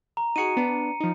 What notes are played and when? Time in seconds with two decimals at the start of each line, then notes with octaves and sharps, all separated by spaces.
0.17 A#5
0.36 D#4 F#4 G#4 C#7 D#7
0.57 B3 D4
1.00 F3 D#4